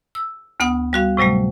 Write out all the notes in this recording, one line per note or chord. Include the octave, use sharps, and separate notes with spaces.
E6
D2 B3 F#5 D#6
G3 F#4 F5
A2 C3 F#3 G3 A3